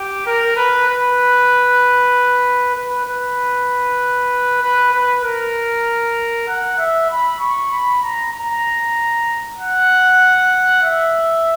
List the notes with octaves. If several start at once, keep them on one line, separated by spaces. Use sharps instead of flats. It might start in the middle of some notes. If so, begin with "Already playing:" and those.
Already playing: G4
A#4
B4
B4
B4
B4
B4
B4
A#4
F#5
E5
B5
C#6
B5
A#5
A#5
F#5
E5